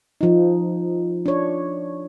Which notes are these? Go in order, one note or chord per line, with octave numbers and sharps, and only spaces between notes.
F3 D#4
D4 C#5